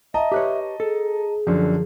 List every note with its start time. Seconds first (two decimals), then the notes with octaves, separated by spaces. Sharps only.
0.14 D#5 E5 A5 A#5
0.32 G4 B4 C#5
0.80 G#4 A4
1.47 F#2 D3 F3